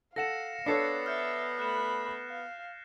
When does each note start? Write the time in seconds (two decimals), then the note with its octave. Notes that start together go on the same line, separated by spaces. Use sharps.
0.16 A4 F5 F#5 A#6 C#7 E7
0.66 B3 D4 A4 C#5 A6 C7 C#7
1.06 E5 F6 G6
1.59 A3 B5 F#6 E7
2.30 F5